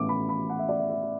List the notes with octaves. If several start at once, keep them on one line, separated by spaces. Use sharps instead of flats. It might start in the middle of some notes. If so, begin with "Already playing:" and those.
Already playing: A1 A2 E3 B3 D6
B5
B5
F#5
E5
D5
E5
E5